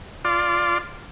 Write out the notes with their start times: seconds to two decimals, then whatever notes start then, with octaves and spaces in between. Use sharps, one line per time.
0.25 F4 D5